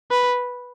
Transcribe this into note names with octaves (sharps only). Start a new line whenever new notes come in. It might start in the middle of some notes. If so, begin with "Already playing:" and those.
B4